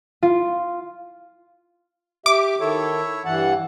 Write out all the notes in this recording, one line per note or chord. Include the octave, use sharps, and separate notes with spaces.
F4
G4 E5 D6
D#3 E4 A4 C#5 E5
G2 E3 F#5 A5